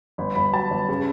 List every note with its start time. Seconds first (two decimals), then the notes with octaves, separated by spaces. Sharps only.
0.18 G1 B5
0.35 G1 B5
0.53 F#3 A5
0.71 G1
0.89 C#3